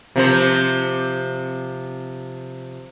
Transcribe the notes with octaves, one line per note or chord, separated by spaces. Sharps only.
C3 F3 C5